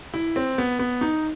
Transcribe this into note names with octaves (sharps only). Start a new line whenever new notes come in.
E4
C4
B3
B3
D#4